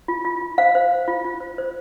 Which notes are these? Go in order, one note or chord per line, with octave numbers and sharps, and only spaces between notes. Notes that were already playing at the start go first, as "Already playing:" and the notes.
F4
F4
F4
C5 F5
C5
C5
F4
F4
C5
C5